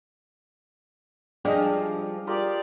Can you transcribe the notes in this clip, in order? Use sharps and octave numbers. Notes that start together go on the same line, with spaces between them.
F3 G3 D4 G#4 D5 D#5
F4 G4 A#4 D5 D#6